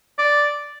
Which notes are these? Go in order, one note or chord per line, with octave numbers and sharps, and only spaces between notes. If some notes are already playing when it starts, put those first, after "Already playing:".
D5